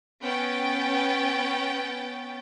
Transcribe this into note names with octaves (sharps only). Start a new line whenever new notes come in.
B3 C#4 G5 A6